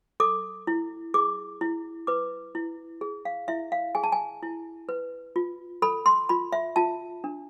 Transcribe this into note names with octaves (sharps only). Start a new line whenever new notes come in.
A4 D6
E4
G#4 D6
E4
B4 D6
E4
G#4
F5
E4 E5
F5
G#4 G#5
A5
G#5
E4
B4
F4
A4 B5
C6
F4 B5
E5
F4 A5
D4